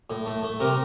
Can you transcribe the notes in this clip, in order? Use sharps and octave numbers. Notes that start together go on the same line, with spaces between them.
A2
A3
A3
C3 A#4